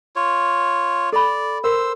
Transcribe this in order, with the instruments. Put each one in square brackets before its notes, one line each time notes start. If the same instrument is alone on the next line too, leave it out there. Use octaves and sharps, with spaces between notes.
[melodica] F4 C#5
[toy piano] A4 B5 [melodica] D5
[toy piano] A#4 [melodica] C5 E6